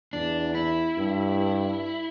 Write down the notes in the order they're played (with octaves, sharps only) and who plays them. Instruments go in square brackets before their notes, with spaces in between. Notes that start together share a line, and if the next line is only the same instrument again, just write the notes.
[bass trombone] E2 [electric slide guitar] D4
[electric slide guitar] E4
[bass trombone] G2